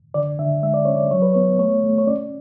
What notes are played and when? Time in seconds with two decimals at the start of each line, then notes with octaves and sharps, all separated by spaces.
0.14 D3 D5
0.39 D3 E5
0.63 G#3 E5
0.74 D5
0.85 C#4 C#5
0.96 D5
1.11 F#3 C#5
1.22 B4
1.34 B3 C#5
1.59 A3 C#5
1.84 A3
1.98 C#5
2.07 C#4 D5